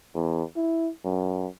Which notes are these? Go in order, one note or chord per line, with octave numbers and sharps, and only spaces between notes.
E2
E4
F#2